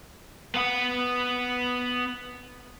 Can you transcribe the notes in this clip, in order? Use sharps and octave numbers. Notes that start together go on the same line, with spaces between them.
B3 F#5